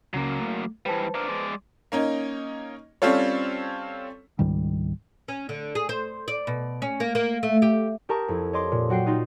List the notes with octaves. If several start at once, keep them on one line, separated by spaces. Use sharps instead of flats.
C#2 C#3 F#3 A#3 C#4
A3
E3 G3 B4 C5 A5
D4 A#4
G#3 D5
A#3 C#4 D#4
G3 C4 C#4 F4 A4 C#5
C#2 G#2 D#3 G3
C#4
D3
G#4
C5
D5
B2
C#4
A#3
A#3
A3
G4
G4 A#4 A5 A#5 C#6 D#6
F2 E4
C#5 D#5 C6 D6
A#2
F#3 F#4 F#5 G5 C7
D#4 F4 F#4